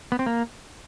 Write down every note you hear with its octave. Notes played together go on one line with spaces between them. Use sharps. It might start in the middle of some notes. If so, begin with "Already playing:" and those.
B3
C4
A#3